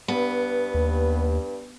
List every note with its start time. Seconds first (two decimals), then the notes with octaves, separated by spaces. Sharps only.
0.08 G2 B3
0.74 D#2